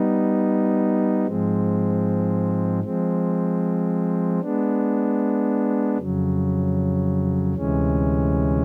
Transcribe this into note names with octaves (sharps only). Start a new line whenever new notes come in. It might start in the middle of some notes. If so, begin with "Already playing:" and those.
Already playing: G3 B3 D#4
G#2 F3 G#3 C4
F3 G#3 C4
G#3 B3 D4
F2 C#3 F#3
D2 C3 E3 G#3 C#4